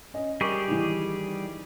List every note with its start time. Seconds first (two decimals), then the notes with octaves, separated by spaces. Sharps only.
0.14 C#4 D#5
0.41 G3 G4 G#4 A#4 C#6 D6
0.68 D#3 E3